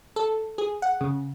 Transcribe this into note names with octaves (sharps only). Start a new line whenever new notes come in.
A4
G#4
F#5
C#3